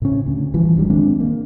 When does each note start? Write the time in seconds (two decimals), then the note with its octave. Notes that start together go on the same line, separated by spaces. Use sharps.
0.02 A2 C#3 C#4
0.26 D2
0.54 E3 F3 G3
0.76 G1 D2 D#3 G3
0.90 D#3 G#3 C4 D4
1.20 A#3